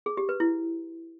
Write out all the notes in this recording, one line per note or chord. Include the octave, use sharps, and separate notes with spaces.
G#4
G4
B4
E4